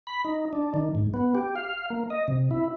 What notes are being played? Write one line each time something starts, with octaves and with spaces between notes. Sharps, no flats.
B5
D#4
D4
D#3
G#2
B3
G4
F5
A#3
D#5
C3
E4